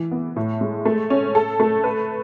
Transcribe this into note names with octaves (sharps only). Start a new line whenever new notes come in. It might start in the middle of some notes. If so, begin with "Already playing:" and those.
Already playing: E3
B3
A2
G#3
A3
C#4
A4
A3
B4